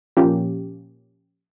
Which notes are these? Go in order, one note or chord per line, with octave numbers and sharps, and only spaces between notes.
A#2 F3 A#3 C#4 G4